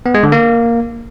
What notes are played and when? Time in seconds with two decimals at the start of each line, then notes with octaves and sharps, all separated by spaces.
0.06 B3
0.14 G#3
0.23 D3
0.32 A#3